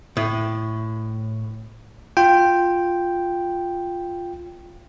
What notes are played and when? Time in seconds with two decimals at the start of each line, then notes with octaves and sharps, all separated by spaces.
0.17 A2
2.17 F4 G5